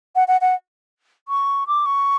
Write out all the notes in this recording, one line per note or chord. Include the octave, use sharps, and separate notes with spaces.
F#5
F#5
F#5
C#6
D6
C#6